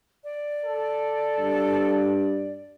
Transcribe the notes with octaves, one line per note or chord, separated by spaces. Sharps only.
D5
A4
G2